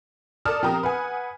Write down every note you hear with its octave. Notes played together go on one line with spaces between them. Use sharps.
A4 A#4 D5 A5 D#6 F6
F3 C4 G4 A#4 A#5 D#6
B4 F#5 G#5